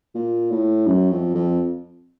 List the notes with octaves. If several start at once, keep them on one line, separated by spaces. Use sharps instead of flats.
A#2
A2
F#2
F2
F2